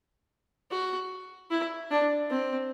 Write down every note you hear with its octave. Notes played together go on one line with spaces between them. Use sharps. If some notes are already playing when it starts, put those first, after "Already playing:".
F#4
E4
D4
C4